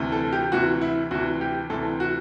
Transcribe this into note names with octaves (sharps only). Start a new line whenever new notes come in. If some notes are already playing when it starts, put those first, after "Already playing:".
Already playing: D2 C3 E3
A4
G4
D2 C3 E3 F#4
E4
D2 C3 E3 F#4
G4
D2 C3 E3 A4
F#4